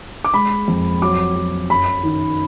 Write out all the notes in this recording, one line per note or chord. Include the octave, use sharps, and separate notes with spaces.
D6
G#3 B5
F2
F#3 D6
F#3
F#2 B5
D#3